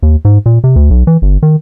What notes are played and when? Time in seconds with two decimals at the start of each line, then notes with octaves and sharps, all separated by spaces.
0.03 D#2
0.25 G#2
0.46 A#2
0.64 C3
0.76 D2
0.90 B1
1.07 E3
1.22 G1
1.43 D#3